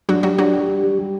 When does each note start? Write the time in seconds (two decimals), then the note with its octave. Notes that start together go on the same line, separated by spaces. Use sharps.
0.09 F#3 D4 F#4
0.23 F#3 F#4 G4
0.38 F#3 D4 F#4
0.53 G4
0.68 G3
0.83 G3
0.99 G3